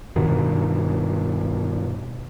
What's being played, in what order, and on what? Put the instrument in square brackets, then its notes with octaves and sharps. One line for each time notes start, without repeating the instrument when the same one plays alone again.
[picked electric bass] G2 B2 D#3